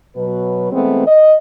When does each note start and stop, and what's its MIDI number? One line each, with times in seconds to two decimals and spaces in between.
0.16 0.72 47
0.16 0.72 54
0.16 0.72 71
0.72 1.06 52
0.72 1.06 56
0.72 1.06 57
0.72 1.06 59
0.72 1.06 60
1.07 1.35 75